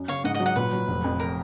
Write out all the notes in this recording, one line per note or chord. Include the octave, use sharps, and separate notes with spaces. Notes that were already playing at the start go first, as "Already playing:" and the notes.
Already playing: F#2
C#3 C#5 F5
G#2 D#5 F#5
D#5 F#5
F#3
D#5 F#5
A#2 B4
F#3
F1
F2
A#4